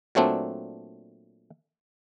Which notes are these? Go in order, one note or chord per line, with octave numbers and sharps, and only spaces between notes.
A#2 F#3 A3 C4 D4